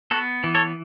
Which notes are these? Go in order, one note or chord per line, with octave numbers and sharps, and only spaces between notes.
B3 F#4 A4
E3
A4 C#5